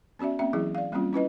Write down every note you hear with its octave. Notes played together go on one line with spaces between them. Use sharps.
B3 C#4 F#4 D5 E5
A#3 C4 C#4 E5
E3 F#3 E4 G#4
D5 F5
G3 A#3 C4 C#4 F4
C#4 E4 B4 D#5